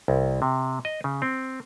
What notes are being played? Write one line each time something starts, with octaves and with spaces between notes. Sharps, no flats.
C2
C3
D#5
C#3
C4